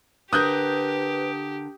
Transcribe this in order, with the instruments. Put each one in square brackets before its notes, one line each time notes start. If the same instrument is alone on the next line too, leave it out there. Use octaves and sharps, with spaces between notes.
[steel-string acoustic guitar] D3 A#4 [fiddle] G4 [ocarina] B4 [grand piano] D#6 F#6 G6